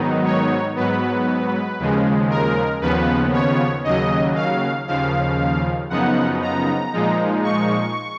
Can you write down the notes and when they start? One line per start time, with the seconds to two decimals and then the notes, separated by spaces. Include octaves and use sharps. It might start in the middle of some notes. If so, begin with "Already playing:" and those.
Already playing: G#2 D#3 F#3 B3 D#4
0.25 C#5
0.75 G#2 F#3 B3 B4
1.79 D#2 C#3 F3 G#3
2.30 A#4
2.81 D#2 C#3 F3 B3 B4
3.33 C#5
3.84 D#2 C#3 F#3 D#5
4.35 F5
4.87 D#2 C#3 F3 F5
5.90 F#2 C#3 F3 B3 D#4 F#5
6.42 A#5
6.93 A#2 F3 G#3 D#4
7.44 C#6